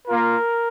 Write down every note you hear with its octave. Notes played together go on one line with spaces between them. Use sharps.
A#3 F4 A#4